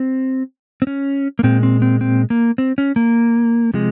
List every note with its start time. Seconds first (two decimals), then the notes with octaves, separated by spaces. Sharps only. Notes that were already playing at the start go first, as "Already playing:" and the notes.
Already playing: C4
0.82 C4
0.87 C#4
1.39 A#3
1.43 A#2 G#3 C4
1.63 C4
1.82 C4
2.01 C4
2.30 A#3
2.58 C4
2.78 C#4
2.96 A#3
3.74 C3 F3 G#3